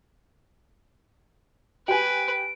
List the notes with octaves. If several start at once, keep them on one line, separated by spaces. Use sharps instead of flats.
G4 B4 G#5 D7